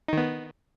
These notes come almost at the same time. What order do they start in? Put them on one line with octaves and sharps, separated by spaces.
D#4 D#3 B3